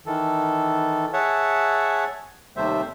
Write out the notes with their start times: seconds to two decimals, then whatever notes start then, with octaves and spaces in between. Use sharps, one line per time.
0.06 D#3 E3 A4
1.13 G#4 C#5 E5 F#5 A5
2.56 D#2 C3 G3 A3 C5 E5